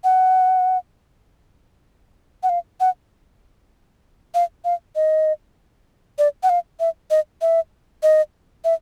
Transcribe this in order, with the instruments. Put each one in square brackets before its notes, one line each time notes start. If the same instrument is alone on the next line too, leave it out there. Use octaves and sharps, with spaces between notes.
[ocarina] F#5
F#5
F5
F#5
F5
F5
D#5
D5
F#5
F5
E5
D#5
E5
D#5
E5